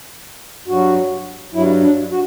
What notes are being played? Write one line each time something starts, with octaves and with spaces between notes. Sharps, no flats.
G2 F#3 F#4
G2 F#3 E4
D4
F#4